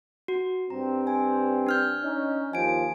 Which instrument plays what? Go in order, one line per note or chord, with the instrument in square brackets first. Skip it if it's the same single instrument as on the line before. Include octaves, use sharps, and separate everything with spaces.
[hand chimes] F#4
[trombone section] G2 C4 [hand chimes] A#5
[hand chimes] G#5
D4 F6 G6
[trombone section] C#4 D#4
[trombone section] D#2 F3 [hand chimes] G#5 D7